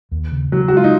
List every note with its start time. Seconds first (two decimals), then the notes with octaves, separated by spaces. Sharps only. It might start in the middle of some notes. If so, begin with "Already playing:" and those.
0.11 D#2
0.32 C#3
0.52 C#3 F#3
0.68 F#4
0.72 G#3 F4
0.84 D#4